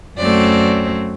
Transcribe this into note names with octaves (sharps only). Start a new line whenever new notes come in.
F#2 F#3 A3 C4 D5